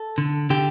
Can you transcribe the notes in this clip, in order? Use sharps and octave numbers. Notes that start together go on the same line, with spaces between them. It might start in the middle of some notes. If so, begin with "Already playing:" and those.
Already playing: A4
D3
D3 G4